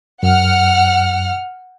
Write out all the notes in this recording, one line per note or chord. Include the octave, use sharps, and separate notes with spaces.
F#2 F#5 F6